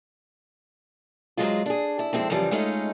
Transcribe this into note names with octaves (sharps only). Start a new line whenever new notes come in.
G#2 F#3 G#3 F4
D4 G#4
E4
F2 G#3 C4 E4
F#2 C#3 E3 F3 G3
G#3 A3 C#4 D#4 F4 G#4